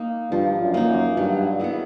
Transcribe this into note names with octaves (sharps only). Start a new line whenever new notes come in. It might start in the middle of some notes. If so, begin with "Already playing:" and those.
Already playing: A#3 D#4
G2 F3
F#2
A#3 D#4
F#2
G2 F#3
B3 E4 G#4